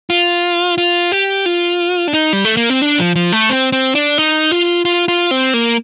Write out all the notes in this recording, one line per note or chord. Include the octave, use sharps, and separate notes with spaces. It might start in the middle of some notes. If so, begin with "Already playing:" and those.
F4
F4
G4
F4
D4
D#4
G3
A3
A#3
C4
D4
F3
F3
A3
C4
C4
D4
D#4
F4
F4
F4
C4
A#3